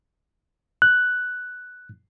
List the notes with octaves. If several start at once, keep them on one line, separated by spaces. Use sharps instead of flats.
F#6